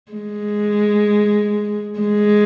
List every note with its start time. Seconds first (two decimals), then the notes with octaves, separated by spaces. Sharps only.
0.12 G#3
1.99 G#3